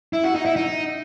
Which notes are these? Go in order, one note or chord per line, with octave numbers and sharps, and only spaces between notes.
E4
F#4
D#4
E4
D#4